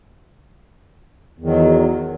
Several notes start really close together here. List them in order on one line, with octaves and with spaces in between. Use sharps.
E2 D#3 F#3